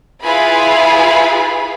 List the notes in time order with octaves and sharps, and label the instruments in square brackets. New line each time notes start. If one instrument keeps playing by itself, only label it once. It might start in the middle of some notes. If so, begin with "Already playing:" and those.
[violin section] E4 F4 G#4 B4 G#5 B5